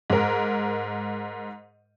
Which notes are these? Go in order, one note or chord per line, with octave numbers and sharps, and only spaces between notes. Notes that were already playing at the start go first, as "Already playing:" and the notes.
G#2 A#4